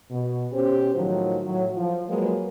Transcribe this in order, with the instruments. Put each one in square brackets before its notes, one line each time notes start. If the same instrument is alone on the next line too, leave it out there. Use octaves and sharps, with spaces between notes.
[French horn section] B2
B2 C#4 G4 C5
A2 D#3 F3 F#3
A2 F#3
F3
F3 F#3 G#3 A#3 B4